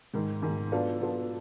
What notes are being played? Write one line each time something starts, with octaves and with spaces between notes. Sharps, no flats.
G#2 D#3 G#3
G#2 D#3 G#3
F#3 B3 D4 F4 A4
F#3 B3 D4 F4 A4